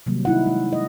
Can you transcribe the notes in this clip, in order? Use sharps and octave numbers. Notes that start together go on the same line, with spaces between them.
C3 D#3 F#3 G3 A#3
D#4 E4 F#5
G#3
D#5